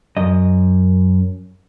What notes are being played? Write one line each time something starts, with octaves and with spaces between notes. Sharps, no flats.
F#2 D#5